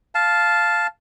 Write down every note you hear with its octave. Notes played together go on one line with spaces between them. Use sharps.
F5 A5